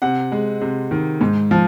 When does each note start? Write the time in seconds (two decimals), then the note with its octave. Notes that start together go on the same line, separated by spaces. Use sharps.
0.02 C3 F#5
0.32 G#3
0.61 C3
0.91 D#3
1.21 G#2
1.51 F3